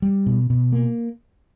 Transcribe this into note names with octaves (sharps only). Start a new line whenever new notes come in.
G3
B2
B2
A#3